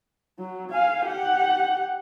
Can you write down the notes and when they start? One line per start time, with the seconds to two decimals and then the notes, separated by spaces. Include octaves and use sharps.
0.39 F#3
0.71 F5 G#5
1.06 G4 F#5